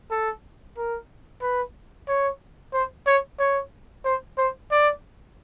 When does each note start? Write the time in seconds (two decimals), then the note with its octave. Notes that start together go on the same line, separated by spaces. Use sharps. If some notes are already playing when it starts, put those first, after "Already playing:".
0.11 A4
0.77 A#4
1.42 B4
2.08 C#5
2.73 C5
3.06 C#5
3.39 C#5
4.05 C5
4.37 C5
4.71 D5